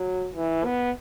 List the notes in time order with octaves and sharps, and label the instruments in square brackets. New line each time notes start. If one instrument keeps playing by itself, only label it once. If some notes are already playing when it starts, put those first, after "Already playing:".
Already playing: [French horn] F#3
E3
B3